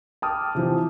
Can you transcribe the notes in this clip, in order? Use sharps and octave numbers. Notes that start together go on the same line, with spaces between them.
G5 A5 D6 D#6 F6
C3 E3 F3